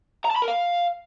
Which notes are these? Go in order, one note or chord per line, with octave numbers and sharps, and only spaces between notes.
A#5
A5
B5
A#4
F5